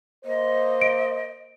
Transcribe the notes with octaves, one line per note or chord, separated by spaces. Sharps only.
A#3 C5 D#5
D7